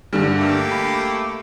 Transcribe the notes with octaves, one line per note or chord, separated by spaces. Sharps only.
G2 D3 G3
A3 A#3 G4
B5